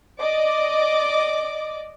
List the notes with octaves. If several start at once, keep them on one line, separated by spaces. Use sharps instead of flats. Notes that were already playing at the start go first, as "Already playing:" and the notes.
D5 D#5 D6